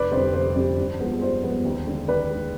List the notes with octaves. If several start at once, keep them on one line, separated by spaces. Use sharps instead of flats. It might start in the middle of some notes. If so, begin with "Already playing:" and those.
Already playing: F1 B4 D5
F2 D3 G3 C5
F1 C5
F2 D3 G3
G2
F3 G#3 B3
G2 C5
F3 G#3 B3
D#2
D3 G#3
D#2 B4 D5
D3 G#3